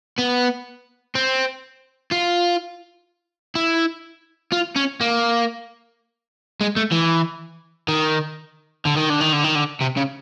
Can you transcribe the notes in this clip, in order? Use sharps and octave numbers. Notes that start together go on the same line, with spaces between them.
B3
C4
F4
E4
F4
C#4
A#3
G#3
A3
E3
D#3
D3
D#3
D3
D#3
D3
D#3
D3
C3
C#3